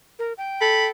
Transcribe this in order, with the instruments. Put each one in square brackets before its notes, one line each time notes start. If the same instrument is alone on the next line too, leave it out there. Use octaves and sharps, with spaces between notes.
[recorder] A#4
G5
[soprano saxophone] A4 [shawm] B5